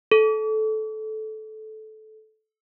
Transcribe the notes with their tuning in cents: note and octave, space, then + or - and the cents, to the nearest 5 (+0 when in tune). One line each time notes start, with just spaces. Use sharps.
A4 -15